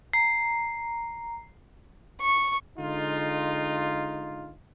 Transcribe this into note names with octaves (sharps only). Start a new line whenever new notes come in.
A#5 C7
C#6
D3 G#3 D#4 F4